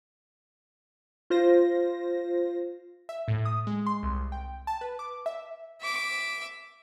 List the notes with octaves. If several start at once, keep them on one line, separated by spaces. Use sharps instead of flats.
F4 C5 A#6
E5
A2
D#6
G#3
C6
C2
G5
A5
B4
D6
E5
E5 D6